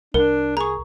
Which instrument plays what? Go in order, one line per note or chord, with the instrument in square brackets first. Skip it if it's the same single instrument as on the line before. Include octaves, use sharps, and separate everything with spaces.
[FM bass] C2 [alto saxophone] D4 [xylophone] A#4
[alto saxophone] G#4 [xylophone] A#5 C#6